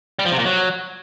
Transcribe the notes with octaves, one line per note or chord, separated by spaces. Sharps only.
G3
F3
C3
A#2
F#3